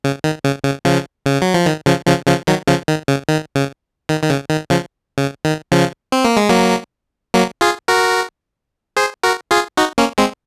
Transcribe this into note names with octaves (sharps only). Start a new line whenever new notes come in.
C#3
D#3
C#3
C#3
C#3 F3
C#3
F#3
F3
D#3
C#3 F3
C#3 F3
C#3 F3
D#3 F#3
C#3 F3
D#3
C#3
D#3
C#3
D#3
D#3
C#3
D#3
C#3 F3
C#3
D#3
C#3 F3
C4
A#3
G#3
F#3 A#3
F#3 A#3
F4 G#4
F#4 A#4
G#4 C5
F#4 A#4
F4 G#4
D#4 F#4
A#3 C#4
G#3 C4